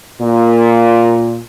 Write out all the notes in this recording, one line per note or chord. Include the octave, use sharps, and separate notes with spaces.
A#2